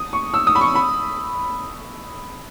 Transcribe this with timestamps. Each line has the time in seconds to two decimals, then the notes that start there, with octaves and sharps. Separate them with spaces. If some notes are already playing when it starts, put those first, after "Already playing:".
Already playing: D#6
0.13 C#6
0.34 E6
0.47 D#6
0.55 B5
0.61 C#6
0.75 B5